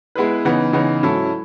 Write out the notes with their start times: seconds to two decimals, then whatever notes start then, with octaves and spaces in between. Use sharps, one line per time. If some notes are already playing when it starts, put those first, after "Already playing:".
0.15 G#3 B3 E4 G#4 B4
0.45 C#3 E3 B3 D#4
0.73 C#3 E3 B3 D#4
1.02 G#2 F#3 C#4 E4 A4